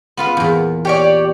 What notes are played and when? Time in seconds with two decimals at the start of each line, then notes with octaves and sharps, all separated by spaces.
0.17 B3 F4 B4
0.37 E2 A#2
0.85 G4 C#5 D5